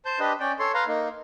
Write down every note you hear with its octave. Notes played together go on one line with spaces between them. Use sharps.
C5 A5 G6
D4 G4 B4 D#5
C#4 D5 G5
A4 C#5 C6
B4 F5 A#5 C6
A#3 D#4